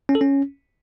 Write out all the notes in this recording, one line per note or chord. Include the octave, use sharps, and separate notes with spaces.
C#4
A4
C#4